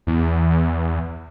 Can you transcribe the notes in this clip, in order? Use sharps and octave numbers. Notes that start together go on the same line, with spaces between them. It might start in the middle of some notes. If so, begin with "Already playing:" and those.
E2